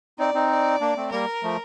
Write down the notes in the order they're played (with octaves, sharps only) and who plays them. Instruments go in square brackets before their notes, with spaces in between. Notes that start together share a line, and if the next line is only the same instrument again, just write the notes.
[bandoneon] C4 D#4 [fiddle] D5
[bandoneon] C4 D#4
[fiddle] D5
[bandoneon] A#3 D4
A3 C4
[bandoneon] G3 A#3 [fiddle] A#4
[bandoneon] F3 A3